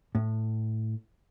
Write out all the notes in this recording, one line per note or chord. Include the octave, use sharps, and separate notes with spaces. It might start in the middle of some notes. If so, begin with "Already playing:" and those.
A2